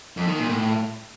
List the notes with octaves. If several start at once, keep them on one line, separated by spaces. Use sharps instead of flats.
F2
D#3
A#2
A2